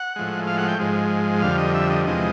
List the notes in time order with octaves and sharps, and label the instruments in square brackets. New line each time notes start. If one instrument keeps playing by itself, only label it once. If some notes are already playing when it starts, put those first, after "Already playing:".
Already playing: [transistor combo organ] F#5
A2 F3 G#3
F5
F#5
G5
G#2 F3 G#3
F2 D3 G3 F5
D#5
E5
D#5
E2 C3 F3 G#3 D#5